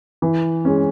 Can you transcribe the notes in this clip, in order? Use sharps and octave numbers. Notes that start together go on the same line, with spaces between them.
E3
G#3 C#4